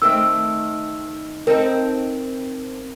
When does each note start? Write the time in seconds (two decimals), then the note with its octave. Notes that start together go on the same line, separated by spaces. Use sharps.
0.02 D#3 A3 C4 E6
1.47 C4 D#4 A4 A#4